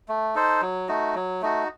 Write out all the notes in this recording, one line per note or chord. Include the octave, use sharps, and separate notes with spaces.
A3
D#4 A4 C5
F#3
A3 D#4 F#4
F#3
A3 D#4 F#4